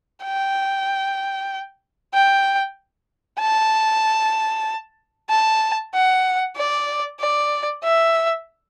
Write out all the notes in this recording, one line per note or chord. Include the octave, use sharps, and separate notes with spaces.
G5
G5
A5
A5
F#5
D5
D5
E5